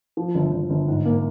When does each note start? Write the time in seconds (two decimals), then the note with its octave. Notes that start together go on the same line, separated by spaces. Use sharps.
0.17 F3
0.35 G1
0.52 G1
0.70 G1
0.88 G#2
1.06 A#3